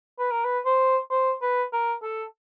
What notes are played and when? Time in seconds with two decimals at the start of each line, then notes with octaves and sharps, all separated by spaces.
0.19 B4
0.31 A#4
0.44 B4
0.65 C5
1.11 C5
1.42 B4
1.73 A#4
2.03 A4